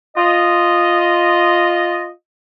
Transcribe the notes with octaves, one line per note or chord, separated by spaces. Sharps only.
F4 D#5